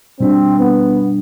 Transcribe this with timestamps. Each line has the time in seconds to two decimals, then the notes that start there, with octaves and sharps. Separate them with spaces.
0.20 B2 G3 C4 D4
0.59 B3